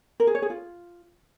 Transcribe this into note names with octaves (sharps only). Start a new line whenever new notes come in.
A#4
G#4
C#5
G#4
F4